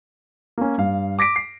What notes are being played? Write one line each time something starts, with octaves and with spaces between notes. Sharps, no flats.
A#3 C#4
G2 F5
D6 A#6 B6 D7
C7